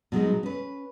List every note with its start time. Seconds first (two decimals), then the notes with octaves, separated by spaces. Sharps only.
0.12 B2 F#3 G#3 D#4
0.43 C#4 B4